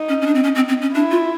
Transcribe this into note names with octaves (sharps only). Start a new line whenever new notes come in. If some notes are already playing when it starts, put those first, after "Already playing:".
Already playing: D#4
C#4
C#4
D4
C4
C#4
C4
C4
C#4
D4 E4
F4